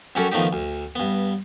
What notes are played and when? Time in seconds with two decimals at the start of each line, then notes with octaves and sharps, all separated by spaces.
0.15 F#2 F#3 C#4 F#4 G4 A4
0.32 D#3 F3 A3 B3 D#4 G4
0.53 D2
0.95 G2 B3